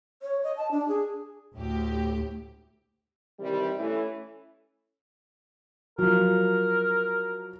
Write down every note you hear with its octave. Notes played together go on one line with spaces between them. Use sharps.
C#5
D#5
A5
D4
G#4
D2 A2 G4
C3 D#3 E3 G3
E3 A3 C#4
F3 F#3 A#4